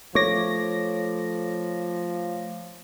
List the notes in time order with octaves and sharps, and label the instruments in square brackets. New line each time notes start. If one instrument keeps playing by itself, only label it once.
[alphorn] F3 [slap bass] A3 [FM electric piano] C#5 D6 A#6